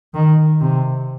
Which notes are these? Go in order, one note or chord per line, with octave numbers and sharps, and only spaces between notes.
D#3
C3